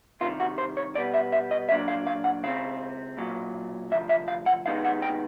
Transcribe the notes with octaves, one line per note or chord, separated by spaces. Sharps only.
C2 C3 D#3 F4
F#4
C5
C#5
B2 G3 B3 D5
E5
E5
D#5
A#2 F#3 A#3 D4 E5
F5
F5
F#5
C#2 C#3 C4 F5
B1 A#2 F#3
D2 C3 F3 E5
E5
F5
F#5
C3 D#3 G#3 B3 D#4 F5
F#5
G5